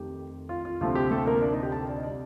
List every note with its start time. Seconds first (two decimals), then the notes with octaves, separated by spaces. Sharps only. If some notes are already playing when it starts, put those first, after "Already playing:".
Already playing: F2 D#3 A3 G4
0.49 F4
0.65 F4
0.81 D2 C3 F3 A3 F4
0.95 G4
1.11 A3 A4
1.26 A#3 A#4
1.42 D4 D5
1.52 D#4 D#5
1.63 G4 G5
1.72 A4 A5
1.88 D5
1.96 D#5
2.03 C3 G3 D5